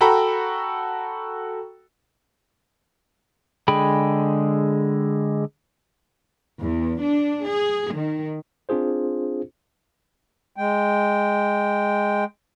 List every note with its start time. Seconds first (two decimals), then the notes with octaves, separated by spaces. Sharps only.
0.01 F#4 A4 G5 A#5 B5
3.68 D3 G#3 G#4 G5 B5
6.60 E2
7.02 D4
7.45 G#4
7.92 D#3
8.69 C4 D4 F4 G#4 C5
10.57 G#3 G5